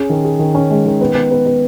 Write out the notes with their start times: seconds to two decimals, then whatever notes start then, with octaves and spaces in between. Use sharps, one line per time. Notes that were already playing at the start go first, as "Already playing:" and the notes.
Already playing: C#4 G#4
0.10 D#3
0.25 G#4
0.39 D#3
0.55 C#4
0.71 G#3
0.86 D#3
1.01 B3
1.15 B3
1.31 B3
1.46 B3